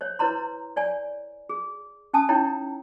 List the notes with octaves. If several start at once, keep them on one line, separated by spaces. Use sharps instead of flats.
C5 C#5
E4 B4 C#5 A#5 C6
C#5 D5 G#5
G#4
C#4 G#5 A5 D#6
D#4 E4 C#5 G5 A#5